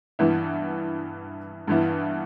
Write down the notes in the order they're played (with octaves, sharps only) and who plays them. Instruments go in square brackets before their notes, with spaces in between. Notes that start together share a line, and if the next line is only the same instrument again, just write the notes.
[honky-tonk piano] G2 E3 B3 E4
G2 E3 B3 E4